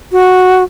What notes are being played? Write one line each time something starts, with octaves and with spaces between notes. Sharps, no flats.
F#4